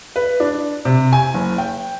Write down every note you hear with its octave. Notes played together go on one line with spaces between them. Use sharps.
B4
D4
C3
G#5
F#1
G5